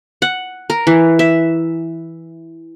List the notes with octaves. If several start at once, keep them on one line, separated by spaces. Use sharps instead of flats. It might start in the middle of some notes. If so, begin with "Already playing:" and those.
F#5
A#4
E3
E5